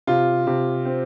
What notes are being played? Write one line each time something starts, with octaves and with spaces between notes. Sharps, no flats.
C3 F4
C3
C4